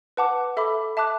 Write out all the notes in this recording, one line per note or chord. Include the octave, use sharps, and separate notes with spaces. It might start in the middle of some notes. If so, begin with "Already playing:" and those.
B4 F#5 A5 D6
A4 E5 B5 D6
E5 A5 D6 F#6